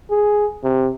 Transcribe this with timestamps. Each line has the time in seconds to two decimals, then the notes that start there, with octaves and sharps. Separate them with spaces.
0.11 G#4
0.64 C3